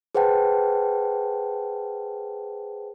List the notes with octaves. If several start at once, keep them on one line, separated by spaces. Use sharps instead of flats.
G#4 B4 C5 F#5 G5 A5